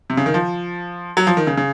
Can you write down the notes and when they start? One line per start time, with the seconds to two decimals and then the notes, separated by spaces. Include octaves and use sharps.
0.10 C3
0.17 C#3
0.26 D#3
0.34 F3
1.17 F#3
1.27 F3
1.37 D#3
1.47 C#3
1.57 C#3